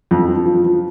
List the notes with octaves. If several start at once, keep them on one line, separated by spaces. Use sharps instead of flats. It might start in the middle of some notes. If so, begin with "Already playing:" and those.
F2
F3
F3
F3